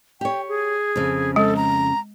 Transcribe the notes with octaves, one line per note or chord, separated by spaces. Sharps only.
G4 C#5 G5
G#4
F2 C#3
G#3 A4
A#5